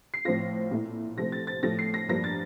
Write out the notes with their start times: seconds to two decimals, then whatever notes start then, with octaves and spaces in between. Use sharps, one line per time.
0.14 C7
0.25 A2 F3 C4 F4 A#6
0.71 A#2 A3 E4
1.17 C3 F3 A3 C4 A#6
1.32 A6
1.47 A6
1.62 A2 F3 A3 A#6
1.79 C7
1.94 A#6
2.09 G2 F3 A#3 D4 A#6
2.24 A6